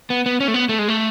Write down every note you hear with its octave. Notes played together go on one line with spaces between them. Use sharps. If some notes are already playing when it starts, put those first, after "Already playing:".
B3
B3
C#4
A3
B3
A3
G#3
A3